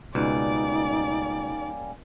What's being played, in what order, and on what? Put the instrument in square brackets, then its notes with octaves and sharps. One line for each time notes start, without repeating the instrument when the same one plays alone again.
[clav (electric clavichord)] C#2 B2 [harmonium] G3 A#3 C#4 [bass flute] D#4 [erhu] D5